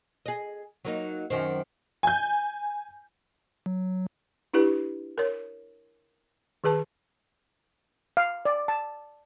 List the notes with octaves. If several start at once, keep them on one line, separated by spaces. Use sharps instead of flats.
G#4 D#5
F#3 A#3 D#4
F#2 D#3 C4
G#5 G6
F#3
D4 E4 G4 B4
A#4 C#5
D#3 G#4 B4 A5
F5
D5
A5